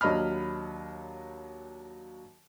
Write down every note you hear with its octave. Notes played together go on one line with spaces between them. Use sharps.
D#2 F#3 D4 D#5 B5 F6